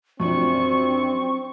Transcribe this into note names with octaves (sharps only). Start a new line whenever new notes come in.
F#2 F3 C4 D4 C#6